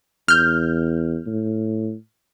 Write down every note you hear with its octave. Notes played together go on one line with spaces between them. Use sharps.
E2 F6 G6
A2